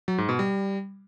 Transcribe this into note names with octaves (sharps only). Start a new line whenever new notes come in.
F#3
G#2
B2
G3